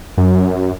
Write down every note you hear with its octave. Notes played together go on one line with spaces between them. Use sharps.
F#2